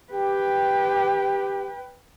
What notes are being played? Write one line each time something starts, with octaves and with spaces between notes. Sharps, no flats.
G4 B4 G5